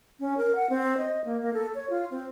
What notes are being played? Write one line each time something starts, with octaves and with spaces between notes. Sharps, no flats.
C#4
A#4
F#5
C4
D#5
A#3
A#3
A4
C#5
F4
C4